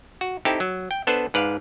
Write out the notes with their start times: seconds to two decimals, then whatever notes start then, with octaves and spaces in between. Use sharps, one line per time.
0.21 F#4
0.45 C4 D#4 E4 G4 A4
0.60 F#3
0.91 G5
1.07 B3 D4 A4 B4 C5
1.34 G#2 B4 D5 F5